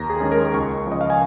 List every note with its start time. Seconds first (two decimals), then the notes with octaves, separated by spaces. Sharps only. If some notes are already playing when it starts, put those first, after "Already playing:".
Already playing: D#2 A#5
0.10 G#4
0.20 D#3 G#3 C#4
0.32 A#4
0.54 C#2 C#6
0.86 C#3 F3
0.92 D#5
1.01 F5
1.10 G#5